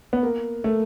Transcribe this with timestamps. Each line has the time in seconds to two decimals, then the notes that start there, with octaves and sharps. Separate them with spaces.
0.13 B3
0.23 A#3
0.64 A3